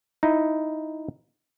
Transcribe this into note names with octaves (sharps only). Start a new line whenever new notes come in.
D#4 E4